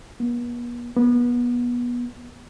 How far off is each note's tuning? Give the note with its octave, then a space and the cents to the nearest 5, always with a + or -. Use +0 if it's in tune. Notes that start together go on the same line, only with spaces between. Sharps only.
B3 -45
B3 -25